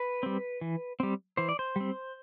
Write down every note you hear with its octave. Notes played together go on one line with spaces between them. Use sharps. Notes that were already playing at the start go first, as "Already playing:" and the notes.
Already playing: B4
G3 C4
E3
G3 C4
E3 C5
D5
C5
G3 C4